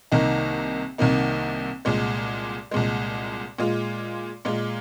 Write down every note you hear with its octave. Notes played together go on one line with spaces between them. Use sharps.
C2 C3 D#3 A#3 D#4
C2 C3 D#3 A#3 D#4
C2 A#2 G#3
C2 A#2 G#3
A#2 G#3 F4
A#2 G#3 F4